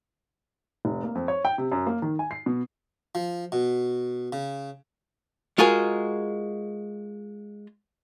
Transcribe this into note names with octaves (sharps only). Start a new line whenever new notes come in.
F1
A#3
F2
C#5
G5
C3
F#2
A#3
D#3
G#5
C7
B2
F3
B2
C#3
G#3 F4 F#4 G#4 A#4